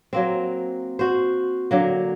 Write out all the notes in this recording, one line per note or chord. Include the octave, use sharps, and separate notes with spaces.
F#3 A#3 C4
F#4 C5
D3 F#3 A#3